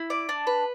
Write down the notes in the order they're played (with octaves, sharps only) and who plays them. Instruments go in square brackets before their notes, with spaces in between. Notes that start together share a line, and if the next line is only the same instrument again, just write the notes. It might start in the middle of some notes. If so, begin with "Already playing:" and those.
Already playing: [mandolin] E4
D5
D4
B4